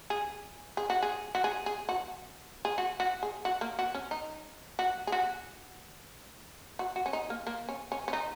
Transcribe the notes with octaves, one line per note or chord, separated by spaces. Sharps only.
G#4
G#4
F#4
G#4
F#4
G#4
G#4
F#4
G#4
F#4
F#4
G#4
F#4
A#3
F#4
C#4
D#4
F#4
G#4
F#4
F#4
F#4
C#4
D#4
A#3
A#3
C#4
C#4
C#4
D#4